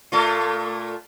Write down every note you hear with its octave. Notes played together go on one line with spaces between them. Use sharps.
A#2 A3 F4